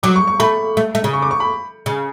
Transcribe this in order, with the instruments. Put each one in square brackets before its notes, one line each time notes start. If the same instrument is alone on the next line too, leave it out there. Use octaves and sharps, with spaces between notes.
[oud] F#3 [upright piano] D6
[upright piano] C#6
C#6
[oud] A3 [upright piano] B5
[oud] A3
A3
C#3
[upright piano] C#6
D6
C#6
B5
[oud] C#3